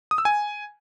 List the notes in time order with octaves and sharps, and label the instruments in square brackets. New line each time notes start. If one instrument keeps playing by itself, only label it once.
[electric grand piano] D#6
E6
G#5